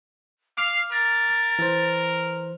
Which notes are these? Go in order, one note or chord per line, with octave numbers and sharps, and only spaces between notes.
F5 D6 F6 C7
A#4 A6
E3 C5